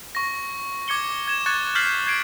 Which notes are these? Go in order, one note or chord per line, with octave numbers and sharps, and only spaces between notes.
C#6 A#6
D6 G#6 C#7 G7
G#6 E7
C#6 F#6 G#6 A6 C#7
F6 G6 A6 B6 C7 F#7
G6 G#6 C7 D7